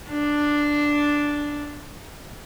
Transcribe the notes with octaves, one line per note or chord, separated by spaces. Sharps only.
D4